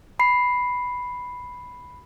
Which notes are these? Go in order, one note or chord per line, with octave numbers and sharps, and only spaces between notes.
B5 C7